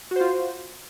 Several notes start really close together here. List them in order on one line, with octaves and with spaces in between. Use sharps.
F#4 C5 F4